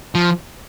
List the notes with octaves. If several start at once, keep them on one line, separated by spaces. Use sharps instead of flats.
F3